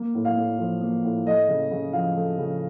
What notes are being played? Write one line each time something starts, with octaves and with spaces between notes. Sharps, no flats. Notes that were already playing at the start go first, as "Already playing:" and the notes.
Already playing: A#3
A2
F5
A2
F3
A#3
A2
A3 D#5
C#3
C#3
F3 F5
A3
C#3